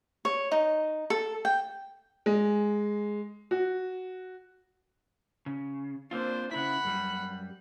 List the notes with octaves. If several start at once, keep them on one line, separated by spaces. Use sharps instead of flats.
C#5
D#4
A4
G5
G#3
F#4
C#3
A#3 C4 D4 F4 C5
C#3 E4 F#5 B5
F#2 G3